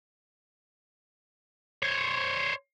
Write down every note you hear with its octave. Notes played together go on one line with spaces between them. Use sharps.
C5 C#5